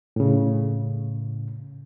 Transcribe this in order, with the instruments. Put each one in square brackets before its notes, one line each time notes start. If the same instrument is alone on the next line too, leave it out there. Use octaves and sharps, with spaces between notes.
[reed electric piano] A2 C#3